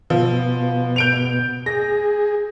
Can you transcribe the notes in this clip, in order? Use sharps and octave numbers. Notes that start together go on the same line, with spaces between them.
B2 F3
G6 D7 F7
G#4 A#6